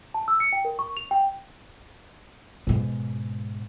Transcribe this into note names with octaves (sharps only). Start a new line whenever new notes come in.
A5
E6
C#7
G5
A#4
C#6
F7
G5
G#2 B2